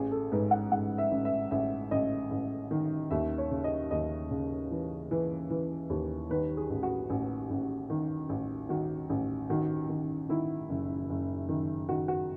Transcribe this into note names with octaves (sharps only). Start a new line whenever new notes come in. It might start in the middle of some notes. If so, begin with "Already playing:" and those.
Already playing: A1 G#4
A4
G#2 B4
F#5
G#2 F#5
E5
A1
E5
A1 E5
A1 D#5
A1
D#3
D#2 E5
C#5
C#3
D#5
D#2 D#5
C#3
E3
E3
E3
D#2
D#3 B4
G#4
A1
F#4
A1
A1
D#3
A1
D#3 F#4
A1
D#3 F#4
D#3
D#3 E4
F#1
F#1
D#3
D#3 F#4
F#4